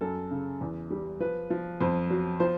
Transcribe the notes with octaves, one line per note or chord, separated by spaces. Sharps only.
F#2 A4
C#3
E2
G3
F3 B4
F3
F2 C5
F#3
F3 C5